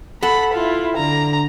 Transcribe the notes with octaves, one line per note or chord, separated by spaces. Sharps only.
A4 F#5 B5
E4 F4
D3 A#5